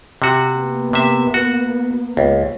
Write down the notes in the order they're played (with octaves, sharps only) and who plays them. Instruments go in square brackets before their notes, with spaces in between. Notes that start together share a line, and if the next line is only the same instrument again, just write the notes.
[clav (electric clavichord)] C3 F#4
[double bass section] A#3 B3
[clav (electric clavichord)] C3 E5
F#4
C#2